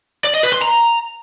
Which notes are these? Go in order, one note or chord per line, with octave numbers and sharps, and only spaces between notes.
D5
D#5
B4
C6
A#5